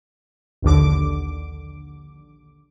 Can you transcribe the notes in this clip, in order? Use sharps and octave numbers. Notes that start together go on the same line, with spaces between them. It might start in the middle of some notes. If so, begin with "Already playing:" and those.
A#1 D#2 D3 D6